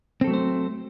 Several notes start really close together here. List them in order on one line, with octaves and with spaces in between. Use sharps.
C4 A4 F#3 A3 C5